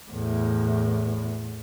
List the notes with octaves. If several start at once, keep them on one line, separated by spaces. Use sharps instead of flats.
E2 A2